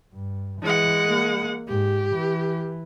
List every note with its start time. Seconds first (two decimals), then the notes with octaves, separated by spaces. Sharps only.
0.13 G2
0.62 E3 G#3 F#5
1.05 A#3
1.68 G#2 G4
2.15 E3